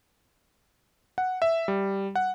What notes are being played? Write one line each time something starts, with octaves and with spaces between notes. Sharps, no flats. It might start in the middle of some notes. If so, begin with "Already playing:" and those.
F#5
E5
G3
F#5